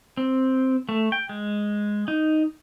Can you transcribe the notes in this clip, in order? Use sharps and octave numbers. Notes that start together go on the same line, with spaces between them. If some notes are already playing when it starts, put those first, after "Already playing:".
C4
A3
G5
G#3
D#4